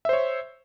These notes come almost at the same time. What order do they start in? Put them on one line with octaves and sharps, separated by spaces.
E5 C5 C#5